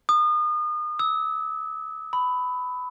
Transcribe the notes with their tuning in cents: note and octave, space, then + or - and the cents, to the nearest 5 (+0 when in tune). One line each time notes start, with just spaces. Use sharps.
D#6 -35
E6 -35
B5 +15